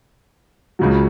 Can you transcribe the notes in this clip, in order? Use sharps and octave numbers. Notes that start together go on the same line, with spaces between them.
C#2 C#3 F#3